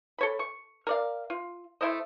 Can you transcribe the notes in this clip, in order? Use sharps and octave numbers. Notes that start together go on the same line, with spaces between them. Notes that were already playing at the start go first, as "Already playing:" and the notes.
A4 C#5 B5
C#6
A#4 D5 F5
F4
A3 E4 C5 D#5